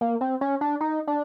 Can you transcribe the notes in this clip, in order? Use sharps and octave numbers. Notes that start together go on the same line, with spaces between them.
A#3
C4
C#4
D4
D#4
D4